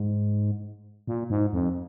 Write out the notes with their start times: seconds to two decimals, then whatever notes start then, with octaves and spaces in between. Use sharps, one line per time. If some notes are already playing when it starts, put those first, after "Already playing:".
Already playing: G#2
1.08 A#2
1.30 G#2
1.53 F2